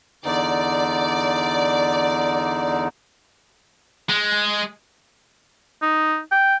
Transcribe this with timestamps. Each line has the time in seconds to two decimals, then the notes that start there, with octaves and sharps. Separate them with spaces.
0.25 E2 D3 D#4 D5
4.10 G#3
5.82 D#4
6.32 G5